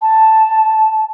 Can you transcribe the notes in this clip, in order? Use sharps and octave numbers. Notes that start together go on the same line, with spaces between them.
A5